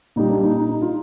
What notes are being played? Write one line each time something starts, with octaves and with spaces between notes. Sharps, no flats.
A#2 G3 D#4
D4
D#4
D#4
D#4
F4